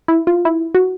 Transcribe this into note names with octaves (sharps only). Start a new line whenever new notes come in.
E4
F4
E4
F#4